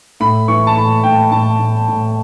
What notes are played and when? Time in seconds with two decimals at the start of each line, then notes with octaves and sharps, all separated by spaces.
0.20 A2 B5
0.48 E3 C#6
0.67 A5
0.76 A2 B5
1.03 A2 G5
1.31 A2 A5
1.59 A2
1.88 A2